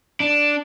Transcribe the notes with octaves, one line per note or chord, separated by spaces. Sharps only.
D4